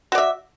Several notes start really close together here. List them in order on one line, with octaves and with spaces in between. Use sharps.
F#4 D5 E5